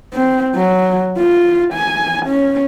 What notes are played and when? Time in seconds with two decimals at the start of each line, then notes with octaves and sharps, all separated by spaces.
0.14 C4
0.55 F#3
1.18 F4
1.73 G#5
2.26 C#4